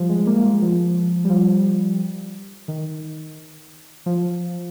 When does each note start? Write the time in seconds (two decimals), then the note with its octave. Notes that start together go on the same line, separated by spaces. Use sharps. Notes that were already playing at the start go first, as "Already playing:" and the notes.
Already playing: F3 G3
0.09 G#3
0.27 A#3
0.37 A#3
0.45 G#3
0.62 F3
1.25 G3
1.30 F3
2.68 D#3
4.06 F3